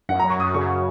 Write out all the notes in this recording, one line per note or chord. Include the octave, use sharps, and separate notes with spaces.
F#2 F#5
A#5
F#3
C#6
F#2 D#6
C#3 C#6